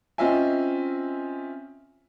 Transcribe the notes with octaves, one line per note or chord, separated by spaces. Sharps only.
C4 C#4 F4 D#5 E5 G#5